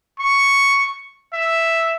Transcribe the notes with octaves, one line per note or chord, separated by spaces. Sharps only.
C#6
E5